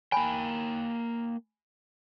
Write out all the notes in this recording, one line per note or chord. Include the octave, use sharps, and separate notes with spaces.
A#3 G5 G#5 B5